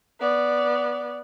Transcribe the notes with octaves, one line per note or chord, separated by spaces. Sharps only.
B3 D5